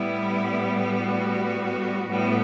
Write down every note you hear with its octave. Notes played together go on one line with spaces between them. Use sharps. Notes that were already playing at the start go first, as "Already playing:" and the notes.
Already playing: A2 G3 B3 E4
F#4
A2 G3 B3